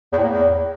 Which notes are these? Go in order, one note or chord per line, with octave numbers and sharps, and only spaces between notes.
E2
A2
A#3
E2